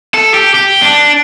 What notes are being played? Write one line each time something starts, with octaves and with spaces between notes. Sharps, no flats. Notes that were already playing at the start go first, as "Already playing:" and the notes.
A4
G4
G4
D4